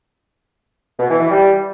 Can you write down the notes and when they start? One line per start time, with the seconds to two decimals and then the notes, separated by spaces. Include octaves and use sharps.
1.00 B2
1.10 E3
1.21 E3
1.31 G3